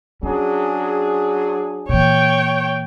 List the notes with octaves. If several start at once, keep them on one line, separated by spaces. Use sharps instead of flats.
F#3 C#4 D4 G#4
A#2 E3 C#5 G5